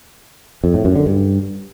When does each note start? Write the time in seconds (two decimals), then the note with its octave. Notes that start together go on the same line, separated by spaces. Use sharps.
0.64 F2
0.74 A2
0.85 F#2
0.96 D3
1.06 G2